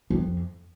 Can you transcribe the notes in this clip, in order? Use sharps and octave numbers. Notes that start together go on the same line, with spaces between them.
F2